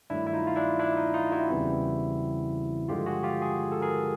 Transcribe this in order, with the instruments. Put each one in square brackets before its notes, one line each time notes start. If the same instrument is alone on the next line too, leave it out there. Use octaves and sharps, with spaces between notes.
[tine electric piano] G2 D#3 F#3 A3 D4 E4
E4
D#4 F4
F4
D4 E4
D4 E4
D#4
D#4 F4
E4 F#4
E2 C#3 E3 G3 C4
G2 D3 F3 G#3 F4 G4
F#4 G#4
F4 G4
F#4 G#4
A4
G#4 A#4